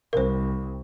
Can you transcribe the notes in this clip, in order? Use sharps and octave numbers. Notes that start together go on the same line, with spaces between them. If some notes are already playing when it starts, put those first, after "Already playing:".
C2 A#4 C5